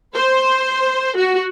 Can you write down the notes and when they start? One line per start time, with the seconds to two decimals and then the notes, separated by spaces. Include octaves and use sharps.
0.14 C5
1.17 F#4